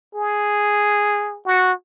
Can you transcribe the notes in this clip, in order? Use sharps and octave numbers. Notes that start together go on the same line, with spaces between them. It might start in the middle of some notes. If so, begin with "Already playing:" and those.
G#4
F#4